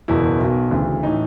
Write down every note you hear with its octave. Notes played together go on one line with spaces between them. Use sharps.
F#1 E2 B2 E4
B1 B2
D2 C#3 E3
A2 E3 D#4